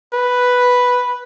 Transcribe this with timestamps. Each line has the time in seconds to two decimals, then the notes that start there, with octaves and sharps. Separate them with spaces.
0.14 B4